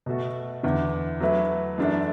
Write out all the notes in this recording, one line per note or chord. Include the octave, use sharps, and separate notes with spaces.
B2 A3 F#4 A4
E2 D3 B3 E4
F#3 A3 E4 B4
F#2 E3 A3 D4 A4